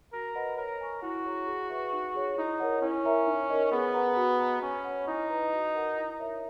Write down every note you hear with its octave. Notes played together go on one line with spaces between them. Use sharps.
F#4 A#4
B4 D#5 F#5 B5
A#4 C#5
G#5 C#6
E4 F#4
G#4 C#5 F#5 A#5
G#4
B4 E5
D#4
G#4 C#5
D#4 E4
A#4 C#5 F#5
C#4 E4
A#4 C#5 E5 A#5
D#4
A#4 D#5
B3 G#4
B4 F#5 A#5
F#4
B4 D#5 A#5
C#4 C#5
F#5 B5
D#4 E4
B4 D#5 A#5
F#4
A#4 D#5 F#5
E4
A#4 C#5 E5 A#5